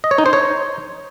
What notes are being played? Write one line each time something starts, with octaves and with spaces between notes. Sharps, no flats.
D#5
C#5
D#4
C5
C#5